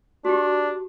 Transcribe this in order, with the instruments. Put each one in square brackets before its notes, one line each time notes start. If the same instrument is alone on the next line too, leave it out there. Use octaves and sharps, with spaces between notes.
[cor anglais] D4 [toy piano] F#4 G4